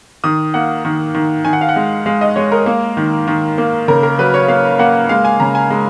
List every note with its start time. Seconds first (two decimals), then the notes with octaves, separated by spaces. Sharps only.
0.24 D#3 D#6
0.54 A#3 F#5
0.85 D#3
1.15 D#3
1.45 D#3 G#5
1.53 F#5
1.61 F5
1.69 F#5
1.76 G#3
2.06 G#3 F5
2.21 D#5
2.36 G#3 C#5
2.52 A#4
2.66 A#3
2.97 D#3
3.28 D#3
3.58 A#3
3.88 C#3 A#4
4.03 A#4
4.18 F#3 B4
4.34 C#5
4.48 A#3 F5
4.79 A#3 F#5
5.09 G#3 F5
5.25 G#5
5.40 C#3 A#5
5.55 G#5
5.70 G#3